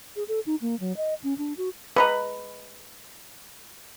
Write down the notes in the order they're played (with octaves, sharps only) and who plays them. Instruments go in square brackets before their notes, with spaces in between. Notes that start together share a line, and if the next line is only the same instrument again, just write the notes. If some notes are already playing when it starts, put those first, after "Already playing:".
[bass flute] G#4
A4
D#4
A#3
F#3
D#5
C#4
D4
F#4
[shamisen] G#3 D#5 A#5 [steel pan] B4